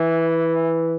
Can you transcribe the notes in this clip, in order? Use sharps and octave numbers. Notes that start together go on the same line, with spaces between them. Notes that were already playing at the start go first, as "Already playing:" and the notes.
Already playing: E3